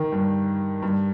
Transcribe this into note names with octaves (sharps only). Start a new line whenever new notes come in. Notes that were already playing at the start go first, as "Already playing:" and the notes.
Already playing: D#3
G2
G2